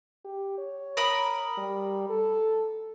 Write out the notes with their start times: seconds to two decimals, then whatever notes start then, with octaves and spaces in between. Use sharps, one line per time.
0.24 G4
0.58 C#5
0.97 A#4 B5 D#6
1.58 G3
2.09 A4